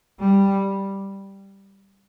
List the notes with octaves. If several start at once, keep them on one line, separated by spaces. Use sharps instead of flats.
G3